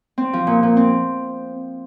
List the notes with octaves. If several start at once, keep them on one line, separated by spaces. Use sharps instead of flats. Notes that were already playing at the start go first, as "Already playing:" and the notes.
C4
F3
A#2
A#2
C4